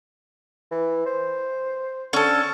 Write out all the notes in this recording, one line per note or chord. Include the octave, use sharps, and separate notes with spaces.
E3
C5
D3 C#4 A4